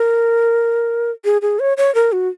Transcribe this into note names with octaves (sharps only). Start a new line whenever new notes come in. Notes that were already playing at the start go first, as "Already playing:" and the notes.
Already playing: A#4
G#4
G#4
C#5
C#5
A#4
F#4